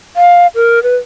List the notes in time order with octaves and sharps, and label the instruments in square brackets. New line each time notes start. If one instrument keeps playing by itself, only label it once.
[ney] F5
A#4
B4